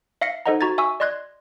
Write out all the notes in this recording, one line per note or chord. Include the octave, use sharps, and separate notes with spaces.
E5 F5 A#6 C7 C#7
D#4 A4 C5 D#5 F#5 A#5
F#4 A#5 G#6 A6
E5 G#5 C#6 E6
D5 D#5 C6 F#6 G#6